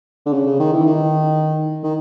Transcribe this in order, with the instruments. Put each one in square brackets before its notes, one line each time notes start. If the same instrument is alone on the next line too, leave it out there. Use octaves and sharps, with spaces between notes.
[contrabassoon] D3
C#3
C#3
D#3
E3
D#3
D#3